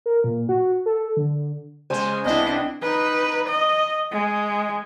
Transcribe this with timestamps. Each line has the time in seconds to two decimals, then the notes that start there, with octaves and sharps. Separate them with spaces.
0.06 A#4
0.24 A#2
0.49 F#4
0.86 A4
1.17 D3
1.90 C#3 G#3 C5 G#5
2.25 C2 B3 C4 D4 E4 D#5
2.82 D#4 B4
3.48 D#5
4.11 G#3